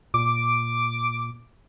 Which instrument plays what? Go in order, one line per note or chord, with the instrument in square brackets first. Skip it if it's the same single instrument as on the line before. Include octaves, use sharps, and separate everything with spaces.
[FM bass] A#2 [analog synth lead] D6